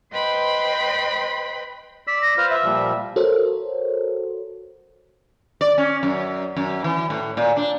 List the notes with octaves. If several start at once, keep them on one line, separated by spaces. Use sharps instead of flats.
B4 C5 D#5 G5 B5 C6
D5 E6 B6
A#6
F4 B4 C5 F6
E5
A#2 F3 G3
F#4 A4 A#4 C5 C#5
D5
C#4
F#2
F#2
E3
A2
A#2
D4